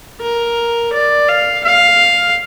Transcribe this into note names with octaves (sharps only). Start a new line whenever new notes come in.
A#4
D5
F5
F5